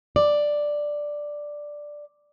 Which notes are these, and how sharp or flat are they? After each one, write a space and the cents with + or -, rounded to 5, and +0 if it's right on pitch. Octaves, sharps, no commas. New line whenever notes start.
D5 +5